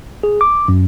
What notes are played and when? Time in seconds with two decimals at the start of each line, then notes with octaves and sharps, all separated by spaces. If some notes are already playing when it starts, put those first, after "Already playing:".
0.23 G#4
0.41 D6
0.68 F#2